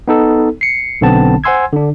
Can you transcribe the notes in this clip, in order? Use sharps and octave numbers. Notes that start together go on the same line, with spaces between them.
B3 D#4 A4
C7 C#7
B1 D3 B3 C4 A5
C5 F#5 G#5 C6 E6 G#6
D3 D4